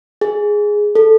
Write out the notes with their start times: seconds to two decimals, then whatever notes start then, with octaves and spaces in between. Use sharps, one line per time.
0.21 G#4
0.95 A4